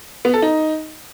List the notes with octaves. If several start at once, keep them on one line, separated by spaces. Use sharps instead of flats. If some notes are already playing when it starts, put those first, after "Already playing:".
B3
A4
D#4